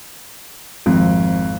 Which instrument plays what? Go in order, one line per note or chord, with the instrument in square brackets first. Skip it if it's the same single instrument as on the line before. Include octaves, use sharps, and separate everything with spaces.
[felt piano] G#1 [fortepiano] F2 [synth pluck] F3